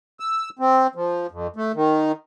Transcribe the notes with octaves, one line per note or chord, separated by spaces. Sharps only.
E6
C4
F3
F2
A3
D#3